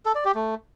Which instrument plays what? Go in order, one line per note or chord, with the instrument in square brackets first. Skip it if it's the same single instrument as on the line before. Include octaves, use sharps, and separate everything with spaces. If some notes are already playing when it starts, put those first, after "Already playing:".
[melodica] A4
D5
G4
A3